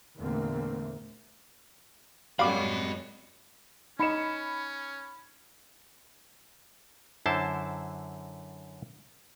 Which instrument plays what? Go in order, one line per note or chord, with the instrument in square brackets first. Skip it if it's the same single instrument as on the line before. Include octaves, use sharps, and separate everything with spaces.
[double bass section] E2 A#2 D3 A3 A#3 C4
[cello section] F#2 G#3 [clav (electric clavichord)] G3 F#4 [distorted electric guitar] D#5 B5 [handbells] F5 D6
[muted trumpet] C#4 [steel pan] D#4 D#5 [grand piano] B5 C#7 E7
[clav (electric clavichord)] F#2 D3 E4 C5 A5